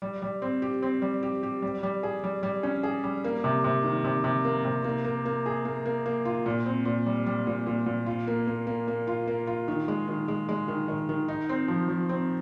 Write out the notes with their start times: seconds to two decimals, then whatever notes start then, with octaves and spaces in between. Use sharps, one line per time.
0.02 G3
0.22 G3
0.42 C4
0.62 G4
0.82 C4
1.02 G3
1.23 G4
1.43 G4
1.62 G3
1.83 G3
2.03 G#4
2.24 G3
2.43 G3
2.63 C#4
2.83 G#4
3.04 G3
3.24 A#3
3.44 C3
3.64 C3
3.84 D#3
4.04 C3
4.24 C3
4.45 A#3
4.65 C3
4.84 A#3
5.05 A#3
5.25 A#3
5.46 G#4
5.65 A#3
5.85 A#3
6.06 A#3
6.25 F4
6.46 A#2
6.66 C4
6.85 A#2
7.06 G3
7.26 G3
7.47 A#2
7.67 A#2
7.86 A#2
8.06 F4
8.27 A#3
8.47 A#3
8.67 A#3
8.88 A#3
9.07 F4
9.28 A#3
9.47 F4
9.68 D#3
9.88 G#3
10.08 D#3
10.28 G#3
10.49 G#3
10.68 D#3
10.88 D#3
11.09 D#3
11.28 D#4
11.49 C4
11.68 F3
11.88 F3
12.09 C4